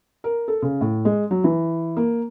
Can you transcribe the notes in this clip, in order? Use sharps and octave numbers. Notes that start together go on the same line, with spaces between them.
A#4
A4
C#3
A2
G#3
F#3
E3
A#3